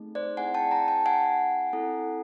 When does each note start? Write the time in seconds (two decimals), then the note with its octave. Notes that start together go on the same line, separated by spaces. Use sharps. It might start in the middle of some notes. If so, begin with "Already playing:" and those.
Already playing: A3 C4 D#4 G#4
0.15 C5 D5
0.37 C4 E4 G#4 F#5 G#5
0.54 G5 A5
0.71 G#5 A#5
0.88 G5 A5
1.06 F#5 G#5
1.73 C4 E4 A4